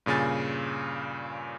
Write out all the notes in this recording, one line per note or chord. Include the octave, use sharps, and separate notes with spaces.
G2 A#2 C#3 G#5 A6